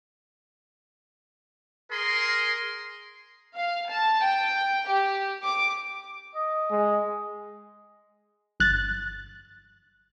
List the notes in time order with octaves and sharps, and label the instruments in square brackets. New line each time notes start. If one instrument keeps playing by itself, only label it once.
[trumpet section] G#4 A#4 C6
[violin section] F5
A5
G5
G4
D6
[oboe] D#5
[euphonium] G#3
[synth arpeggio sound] G1 F#6 A6